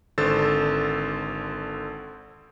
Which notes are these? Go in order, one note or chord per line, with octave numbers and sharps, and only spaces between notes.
G#1 D3 A4 C5 E6 A6